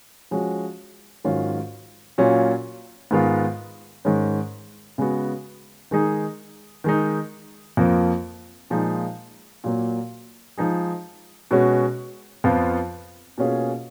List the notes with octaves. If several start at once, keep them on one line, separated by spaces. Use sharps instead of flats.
F3 G#3 C#4 F#4
G#2 D#3 F#3 C#4 F4
A#2 F#3 C#4 F4
G#2 D#3 G#3 B3 F4
G#2 D#3 G#3 C#4
C#3 G#3 B3 F#4
D#3 G#3 D#4 G#4
D#3 G#3 D#4
F2 F3 A#3
A#2 F3 G#3 D#4
A#2 F#3 A#3
F3 G#3 D#4 G#4
B2 G#3 C#4 F#4
F2 F3 B3 F4
B2 A#3 C#4 F4 G#4